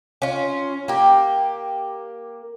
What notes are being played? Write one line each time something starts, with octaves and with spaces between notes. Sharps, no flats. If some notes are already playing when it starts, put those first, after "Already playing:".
C#4 F4
A#3 G4